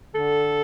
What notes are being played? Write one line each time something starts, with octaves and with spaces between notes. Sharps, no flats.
D3 A4